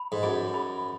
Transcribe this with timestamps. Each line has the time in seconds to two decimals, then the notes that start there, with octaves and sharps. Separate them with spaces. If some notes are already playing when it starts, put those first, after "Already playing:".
Already playing: B5
0.12 G#2
0.23 F#2 G#4
0.54 B5